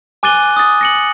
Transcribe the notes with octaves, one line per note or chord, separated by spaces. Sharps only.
G#5 D6 F#6 A6 D#7 G7
D#6 A6
A#6 C#7 F#7